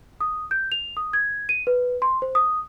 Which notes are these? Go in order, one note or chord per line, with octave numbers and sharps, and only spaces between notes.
D#6
G6
F7
D#6
G#6
D#7
B4
C6
C5
D#6